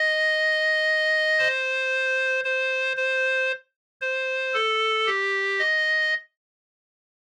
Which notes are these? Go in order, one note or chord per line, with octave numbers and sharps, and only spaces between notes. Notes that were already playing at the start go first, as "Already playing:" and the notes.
Already playing: D#5
C5
C5
C5
C5
A4
G4
D#5